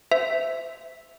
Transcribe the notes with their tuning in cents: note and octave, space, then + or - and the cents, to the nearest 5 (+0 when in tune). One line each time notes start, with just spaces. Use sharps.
C5 -30 E5 +0